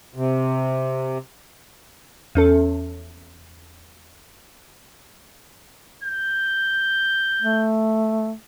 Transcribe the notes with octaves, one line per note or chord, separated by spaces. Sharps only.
C3
E2 C#4 A4
G6
A3